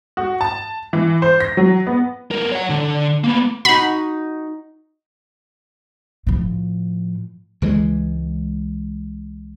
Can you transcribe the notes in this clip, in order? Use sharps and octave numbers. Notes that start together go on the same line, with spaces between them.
F#4
A5
E3
C5
A#6
F#3
B3
B3 A#4
C#5 F#5
D3
A#3 B3
D#4 F#4 B5
A2 F3
C#2 E3 F#3 G#3